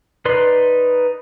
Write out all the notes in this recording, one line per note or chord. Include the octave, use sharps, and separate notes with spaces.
D#4 B4 D5 C6